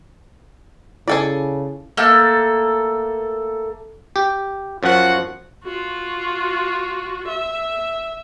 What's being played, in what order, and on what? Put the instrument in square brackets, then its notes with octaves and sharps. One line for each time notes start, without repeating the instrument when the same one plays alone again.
[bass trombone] C#3 [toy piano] E4 [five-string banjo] G#4 A4 D5
[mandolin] A3 A#3 A4
[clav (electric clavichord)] G4
[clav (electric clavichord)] F#2 F3 [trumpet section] F4 F#4 F#5
[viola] F4 F#4
E5